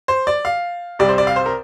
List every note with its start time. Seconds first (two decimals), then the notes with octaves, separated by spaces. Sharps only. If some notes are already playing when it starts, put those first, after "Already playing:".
0.08 C5
0.27 D5
0.45 F5
0.99 C2 C3 G3 D5
1.09 C5
1.18 D5
1.27 F5
1.36 C5
1.46 A#4